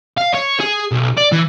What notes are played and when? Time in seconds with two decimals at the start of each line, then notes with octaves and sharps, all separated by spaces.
0.17 F5
0.33 C#5
0.59 G#4
0.92 B1
1.18 D5
1.33 E3